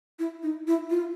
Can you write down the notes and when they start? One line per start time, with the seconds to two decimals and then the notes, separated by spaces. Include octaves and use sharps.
0.19 E4
0.43 D#4
0.68 E4
0.90 F4